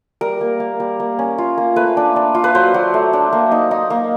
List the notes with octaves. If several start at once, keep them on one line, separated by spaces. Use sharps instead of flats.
G3 A#4
A#3
A#3
G3
A#3
C#4
F4
A#3
A3 B4
D4
D4
F4
B4
F#3 C5
F#3
A3
D4
A#3
D#4
D#4
A#3